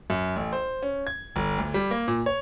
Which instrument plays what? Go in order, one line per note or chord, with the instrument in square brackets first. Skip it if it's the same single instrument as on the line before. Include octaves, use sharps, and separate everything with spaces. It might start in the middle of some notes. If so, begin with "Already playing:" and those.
[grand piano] F#2
A1
C5
C#4
G#6
G1
D2
G3
A#3
A#2
C#5